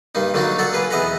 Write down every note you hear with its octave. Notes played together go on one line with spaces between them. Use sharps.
G2 A#3 D#4
D3 F#3 A#3 D4 D#4 F#4
D4 A4 F#5
A#3 G#4 B4
E2 E4 D#5 F#5 A#5 B5